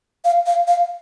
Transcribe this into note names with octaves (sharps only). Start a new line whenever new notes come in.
F5
F5
F5